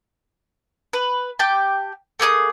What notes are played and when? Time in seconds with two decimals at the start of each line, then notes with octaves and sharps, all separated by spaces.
0.93 B4
1.39 G4 G5 A5
2.20 A3 A#3 G#4 D#6